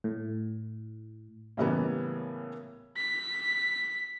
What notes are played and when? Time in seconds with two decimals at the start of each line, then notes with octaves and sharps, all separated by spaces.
0.04 A2
1.57 A2 C#3 E3 G3 A#3 B3
2.97 B6